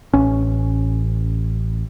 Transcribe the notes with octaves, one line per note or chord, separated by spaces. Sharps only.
A1 C#4